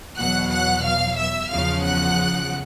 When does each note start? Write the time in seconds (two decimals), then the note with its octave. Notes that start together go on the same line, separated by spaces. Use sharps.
0.18 E2 B2 F#3 F#5 F#6
0.51 F#5 F#6
0.85 F5 F6
1.17 E5 E6
1.49 E2 C#3 F3 F5 F6
1.83 F#5 F#6